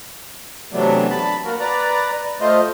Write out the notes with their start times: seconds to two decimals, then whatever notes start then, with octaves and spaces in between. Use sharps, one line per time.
0.73 C3 E3 F#3 A3 B3 D4
1.10 A5 B5
1.44 A#3 F#4 A#4
1.60 B4 D5 A#5
2.41 A3 F4 C5 D#5